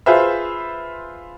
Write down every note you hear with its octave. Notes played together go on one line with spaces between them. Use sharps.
F4 G#4 B4 C5 E5